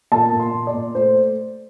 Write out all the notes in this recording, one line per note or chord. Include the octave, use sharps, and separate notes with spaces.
A#2 A5
A#2
C6
A#2
D5
A#2
A3 C5